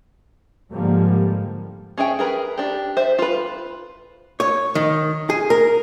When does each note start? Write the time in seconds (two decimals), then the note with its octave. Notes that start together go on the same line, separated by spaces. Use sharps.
0.72 G#2 D3 F3 G3 A#3
1.98 C#4 G#4 E5 G5
2.19 G#4 A#4 B4
2.58 D4 G4
2.97 C5 E5
3.18 F4 B4
4.40 C#5
4.75 D#3
5.30 G#4
5.50 A#4